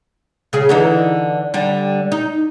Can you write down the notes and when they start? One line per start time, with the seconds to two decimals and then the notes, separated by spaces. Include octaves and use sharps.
0.53 C#3 G#4
0.69 D3 E3 D#4
1.54 D3 G3
2.12 D#4